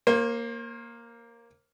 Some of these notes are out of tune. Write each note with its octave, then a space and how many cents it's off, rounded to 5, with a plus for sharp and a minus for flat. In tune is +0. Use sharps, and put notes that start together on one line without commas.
A#3 +0 C5 +40